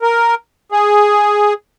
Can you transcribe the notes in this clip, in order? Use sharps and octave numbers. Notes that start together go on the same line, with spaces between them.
A#4
G#4